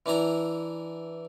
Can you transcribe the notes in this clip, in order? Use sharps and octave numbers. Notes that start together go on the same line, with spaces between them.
E3 D4 E4 A#5